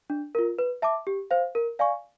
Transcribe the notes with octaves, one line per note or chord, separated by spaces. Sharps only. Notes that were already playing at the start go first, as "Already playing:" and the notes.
D4
F4 A#4
B4
E5 A5 D6
G4
C5 F5
A#4
D5 F5 G#5 C#6